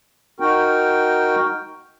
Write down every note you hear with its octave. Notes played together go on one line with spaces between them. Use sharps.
D#4 F#4 A#4 G5